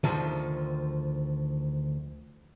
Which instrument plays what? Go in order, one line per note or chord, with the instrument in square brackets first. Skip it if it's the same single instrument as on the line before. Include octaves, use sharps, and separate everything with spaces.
[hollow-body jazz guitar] D2 D#3 F3